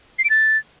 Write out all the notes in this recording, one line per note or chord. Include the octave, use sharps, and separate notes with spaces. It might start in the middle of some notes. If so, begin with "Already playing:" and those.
C7
D7
A6